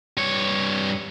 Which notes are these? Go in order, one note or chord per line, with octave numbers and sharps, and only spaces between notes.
G2 C#5